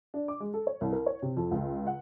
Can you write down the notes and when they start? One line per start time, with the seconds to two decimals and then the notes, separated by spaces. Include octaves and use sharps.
0.14 D4
0.28 D6
0.40 G#3
0.54 A4
0.67 C#5
0.81 C2
0.93 A#4
1.06 C#5
1.22 C3
1.37 F2
1.51 C#2
1.87 F#5